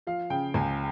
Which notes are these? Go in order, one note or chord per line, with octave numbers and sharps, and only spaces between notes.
F3 F5
C#3 G5
C#2 G#5